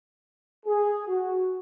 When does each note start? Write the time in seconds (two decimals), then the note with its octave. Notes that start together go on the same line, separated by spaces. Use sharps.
0.66 G#4
1.07 F#4